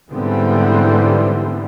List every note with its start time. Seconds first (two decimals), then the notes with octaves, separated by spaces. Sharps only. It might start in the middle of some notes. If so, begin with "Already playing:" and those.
0.10 G#2 D3 E3 G3 B3 C4